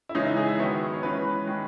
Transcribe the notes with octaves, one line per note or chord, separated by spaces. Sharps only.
E4
C#3 E3 G#3 C#4 D#4
E4
G#4
E5
D#3 F#3 B3 C#5
C#5
E3 G#3 C#4 B4
D#3 G#3 C#4